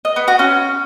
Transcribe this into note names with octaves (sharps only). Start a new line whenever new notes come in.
D#5
B3
F#4
C#4